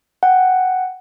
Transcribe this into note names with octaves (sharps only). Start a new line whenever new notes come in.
F#5 G5